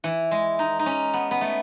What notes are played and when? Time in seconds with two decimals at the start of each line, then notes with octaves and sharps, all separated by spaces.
0.04 E3
0.31 G#3
0.59 D#4
0.79 D#4
0.86 C#4
1.14 B3
1.31 B3
1.41 A3